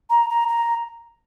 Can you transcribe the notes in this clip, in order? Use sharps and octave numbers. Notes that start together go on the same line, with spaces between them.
A#5
A#5
A#5